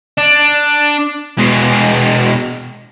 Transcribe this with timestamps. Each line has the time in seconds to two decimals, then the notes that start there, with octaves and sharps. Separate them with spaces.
0.18 D4
1.39 B2 G#3